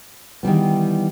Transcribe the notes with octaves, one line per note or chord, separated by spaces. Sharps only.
D#3 E3 G3 B3